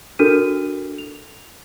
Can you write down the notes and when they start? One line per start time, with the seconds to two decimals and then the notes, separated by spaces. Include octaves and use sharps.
0.19 D4 F#4 A4 A#4 F6 D#7
0.98 F7